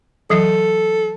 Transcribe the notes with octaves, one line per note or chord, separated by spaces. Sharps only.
E3 F#3 A4